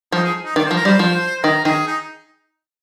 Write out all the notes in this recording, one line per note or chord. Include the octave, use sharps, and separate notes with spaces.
F3 D#4
G#4
D#4
D#3 D5
F3 C5
A#4
G3 C5
F3
D#3 A#4
D#3 G#4
D#4